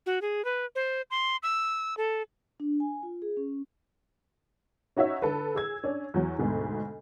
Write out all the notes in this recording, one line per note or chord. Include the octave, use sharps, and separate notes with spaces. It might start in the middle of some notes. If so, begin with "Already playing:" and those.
F#4
G#4
B4
C5
C6
E6
A4
D4
G#5
F4
G#4
C#4
C#4 D#4 F#4 C#5 E5
D3 A4 B4
G#4 E6 G#6
C#4 D4
E2 F#3
D2 G#2 B2 D3